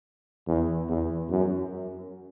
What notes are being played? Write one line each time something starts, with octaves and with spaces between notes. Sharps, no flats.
E2
E2
F#2